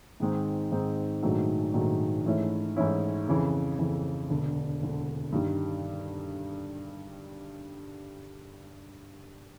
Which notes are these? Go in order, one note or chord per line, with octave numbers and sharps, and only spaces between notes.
G#2 D#3 G#3 C4 D#4
G#2 D#3 G#3 C4 D#4
A#1 G#2 D#3 F#3 A3
A#1 G#2 D#3 F#3 A3
G#2 E3 A3 C#4 E4
G#2 E3 A3 C#4 E4
F2 C#3 E3
F2 C#3 E3
E1 D2 D3
E1 D2 D3
G2 D#3 G3